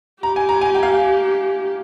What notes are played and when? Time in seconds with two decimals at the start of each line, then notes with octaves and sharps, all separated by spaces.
0.23 G4 A#5
0.36 G#5
0.49 A#5
0.61 G#5
0.75 G5
0.83 F5